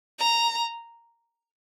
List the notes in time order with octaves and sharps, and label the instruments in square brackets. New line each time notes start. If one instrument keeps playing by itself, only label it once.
[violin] A#5